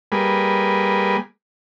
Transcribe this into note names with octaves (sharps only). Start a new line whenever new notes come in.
G3 A#3 G#4 B4